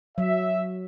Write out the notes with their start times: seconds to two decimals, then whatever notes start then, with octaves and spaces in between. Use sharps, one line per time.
0.18 F#3 E5